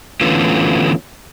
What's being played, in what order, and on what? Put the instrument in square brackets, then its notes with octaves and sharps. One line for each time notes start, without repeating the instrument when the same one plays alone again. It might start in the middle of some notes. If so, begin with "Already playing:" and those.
[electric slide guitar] D3 E3 A3 B3 C#4 F4